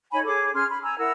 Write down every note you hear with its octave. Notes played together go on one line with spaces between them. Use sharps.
D#4 C#5 G#5 B5
G#4 A4 C#5 D6
C#4 G#4 C6 F6
B5
G#5 A#5 E6
E4 A#4 F#5 E6